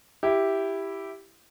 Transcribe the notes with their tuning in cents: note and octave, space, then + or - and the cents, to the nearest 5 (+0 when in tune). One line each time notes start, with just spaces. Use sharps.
E4 +0 G4 +0